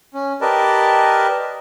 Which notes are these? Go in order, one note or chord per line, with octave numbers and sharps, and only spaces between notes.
C#4
G4 A#4 B4 D5 D#5 A5